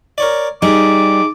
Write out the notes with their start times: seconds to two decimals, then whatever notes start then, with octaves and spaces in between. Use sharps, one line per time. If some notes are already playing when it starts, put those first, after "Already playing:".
0.18 A#4 C#5 D5
0.62 G3 D#4 G#4 D6